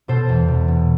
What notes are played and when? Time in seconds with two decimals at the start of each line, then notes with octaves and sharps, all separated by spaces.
0.08 B2 A4 C5
0.29 E2
0.48 B2
0.68 B2